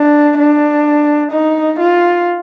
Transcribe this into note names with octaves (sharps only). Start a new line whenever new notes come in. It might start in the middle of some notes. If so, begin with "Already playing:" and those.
Already playing: D4
D4
D#4
F4